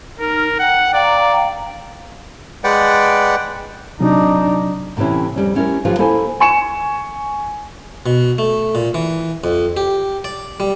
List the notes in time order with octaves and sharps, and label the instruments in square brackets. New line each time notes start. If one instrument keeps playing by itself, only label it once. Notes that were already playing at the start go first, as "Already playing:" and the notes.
[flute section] D#4 F6 [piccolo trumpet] A#4
[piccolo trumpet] F#5 [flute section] G5
[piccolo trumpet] D5 [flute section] F5 G5 A#5
[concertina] G#3 B4 D5 F#5 G5
[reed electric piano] C3 F#3 [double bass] D4 D#4
[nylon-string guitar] A2 C3 E3 C#4 E4
F2 G3 C#4
A3 C#4 E4 G4 A4 A#4
D3 F3 F#3 F4 G4 B4
A#3 E4 A4 C5 G#5
[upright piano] G#5 C#6 C#7 E7
[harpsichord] B2
A3
A#2
E3
F2
G4
D5
G3